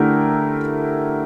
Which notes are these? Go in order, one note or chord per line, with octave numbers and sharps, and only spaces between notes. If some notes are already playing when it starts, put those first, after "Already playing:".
Already playing: D3 A3 E4 G4 A#4